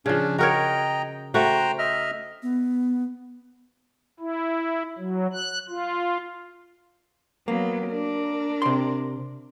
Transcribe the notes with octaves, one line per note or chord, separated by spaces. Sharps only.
C#3 F3 C#4 D4
F#4 A#4 C#5 D#5 G5 A#5
A3 F#4 C5 G5 A#5
D#5 E5 F6
B3
E4
F#3
F#6
F4
F#3 A#3 B3
D4 A#4
C3 C6